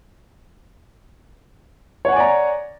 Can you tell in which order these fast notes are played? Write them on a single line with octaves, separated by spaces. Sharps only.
C#5 F#5 G#5 D5 A#5